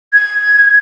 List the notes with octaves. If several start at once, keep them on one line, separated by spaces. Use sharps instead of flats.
G#6